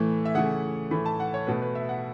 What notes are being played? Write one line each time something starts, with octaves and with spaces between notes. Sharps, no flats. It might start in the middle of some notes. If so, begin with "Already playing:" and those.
Already playing: A2 E3 A3
E5
C#3 E3 A3 F#5
A2 E3 A3 B5
A5
F#5
C#5
B2 A3 B4
B4
E5
F#5